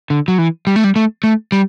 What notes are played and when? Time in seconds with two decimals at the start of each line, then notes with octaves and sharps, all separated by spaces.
0.10 D3
0.28 F#3
0.38 E3
0.67 G3
0.76 A3
0.84 G3
0.96 A3
1.24 A3
1.52 G3